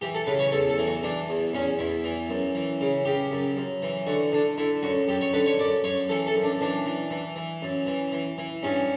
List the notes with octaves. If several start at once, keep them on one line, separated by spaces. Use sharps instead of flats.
E3 G4
A4
C#3 B4
C#5
E2 A4
A4
E3
F#4
E3 D4
E2
E2 C#4
E2 E4
E3
F#2
E3
C#3
C#3 G4
F#2
F#2
E3
D3 F#4
D3 D4
D3 E4
F#2 F#4
F#2 G4
C#5
D3 B4
C#5
F#2 D5
F#2 C#5
E3 A4
A4
F#2
D4
E3 D4
E3
E3
E3
F#2
E3
E3
E3
G2 C#4